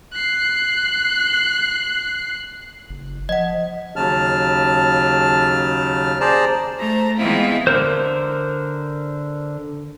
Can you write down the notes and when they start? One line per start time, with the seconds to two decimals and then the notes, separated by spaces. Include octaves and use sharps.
0.12 F#6 C7
2.90 F#1
3.29 F3 D#5 F#5
3.96 D#2 C#3 F#3 A5 F6
6.21 G#4 C5 D5 A5 A#5
6.79 A3 C5 A#5
7.17 E3 G#3 B3 C4 E4 F4
7.67 D3 A#4 C5